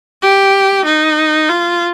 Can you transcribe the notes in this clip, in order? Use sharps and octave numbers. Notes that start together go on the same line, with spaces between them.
G4
D#4
F4